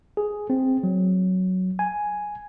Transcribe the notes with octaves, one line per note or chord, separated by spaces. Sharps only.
G#4
C4
F#3
G#5